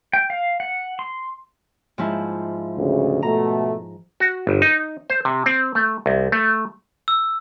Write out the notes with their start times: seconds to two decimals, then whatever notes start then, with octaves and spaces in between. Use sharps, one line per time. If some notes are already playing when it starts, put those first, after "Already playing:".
0.13 G5
0.30 F5
0.60 F#5
0.99 C6
1.98 G#2 F3 E4
2.77 D2 C#3
3.23 B2 A3 A#5
4.20 F#4
4.47 G1
4.62 D#4
5.10 C5
5.25 C3
5.46 C4
5.75 A3
6.06 C2
6.32 A3
7.08 E6